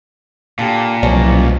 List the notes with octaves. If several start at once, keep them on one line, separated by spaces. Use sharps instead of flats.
A#2 D3 G4
C2 B2 F3 F#3 C#4 C#5